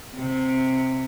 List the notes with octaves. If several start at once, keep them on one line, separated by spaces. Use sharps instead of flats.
C3